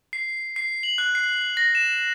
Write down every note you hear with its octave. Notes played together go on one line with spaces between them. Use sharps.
C7
C7
F#7
F#6
C7
A#6
E7